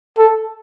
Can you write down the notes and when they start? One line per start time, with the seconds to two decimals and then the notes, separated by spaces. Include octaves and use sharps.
0.18 A4